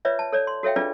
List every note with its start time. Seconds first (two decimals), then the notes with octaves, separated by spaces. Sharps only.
0.05 F4 B4 C#5 D5 E5
0.19 A5
0.32 A4 C#5 D5
0.47 C6
0.63 F#4 A4 C#5 E5 F5 G5
0.76 D4 F4 G#4 A4 B4 D5